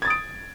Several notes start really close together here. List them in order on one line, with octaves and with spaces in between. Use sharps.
G#6 A6 D#6 D7